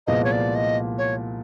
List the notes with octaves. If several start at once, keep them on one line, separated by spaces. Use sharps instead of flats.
C2 A#2 F3 G#3 B3 D#5
C#5
D5
D#5
C#5